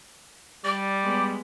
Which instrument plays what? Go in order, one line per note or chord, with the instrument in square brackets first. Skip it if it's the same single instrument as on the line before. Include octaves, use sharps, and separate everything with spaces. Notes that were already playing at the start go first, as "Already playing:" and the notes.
[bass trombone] G3 [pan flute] D5 [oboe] D6
[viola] G#3 B3